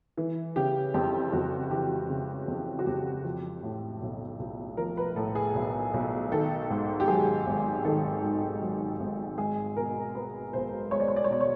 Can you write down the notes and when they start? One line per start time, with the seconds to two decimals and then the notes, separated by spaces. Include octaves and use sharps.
0.17 E3
0.56 C#3 G4
0.94 F2 G4
1.32 F2 F#4
1.71 E3 G4
2.10 C#3
2.48 F2
2.79 F#4
2.86 F2 G4
3.24 F3
3.63 A2
4.01 B1
4.39 B1
4.77 F3 A#4
4.97 B4
5.16 A2 A4
5.35 G#4
5.55 B1
5.94 B1
6.32 D#3 A4
6.70 G#2
7.00 G4
7.08 F#3 G#4
7.47 G#1
7.85 D#3 A4
8.23 G#2
8.61 F#3
9.00 G#1
9.38 G#3 G#4
9.77 B2 A#4
10.15 B3 B4
10.53 B1 C5
10.91 G#3 C#5
11.00 D5
11.08 C#5
11.16 D5
11.24 C#5
11.30 B2 D5
11.40 C#5